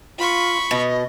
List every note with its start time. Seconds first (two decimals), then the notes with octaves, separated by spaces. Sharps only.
0.19 F4 B5 C#6
0.71 B2 D#5